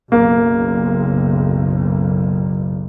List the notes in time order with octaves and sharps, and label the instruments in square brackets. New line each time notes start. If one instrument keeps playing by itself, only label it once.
[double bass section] F#1 B1 [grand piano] A#3